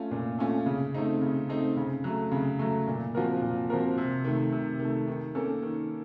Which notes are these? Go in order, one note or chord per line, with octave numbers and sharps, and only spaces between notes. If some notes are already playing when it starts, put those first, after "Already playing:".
Already playing: A3 C#4 F4
A#2
A3 C#4 F4
C#3
A3 C4 D#4
C#3
A3 C4 D#4
C#3
F#3 A3
C#3
F#3 A3
A#2
F3 C4 F#4 A#4
A#2
F3 C4 F#4 A#4
C3
D#3 A3
C3
D#3 A3
D#3
A#3 C#4 A4
D#3